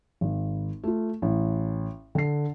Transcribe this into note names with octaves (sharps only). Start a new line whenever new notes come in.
G#1
A3 F4
A1
D3 C7